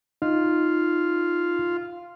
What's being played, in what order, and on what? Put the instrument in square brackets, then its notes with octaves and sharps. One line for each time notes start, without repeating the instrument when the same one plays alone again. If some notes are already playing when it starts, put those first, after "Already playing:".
[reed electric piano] D#4 [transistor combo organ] F4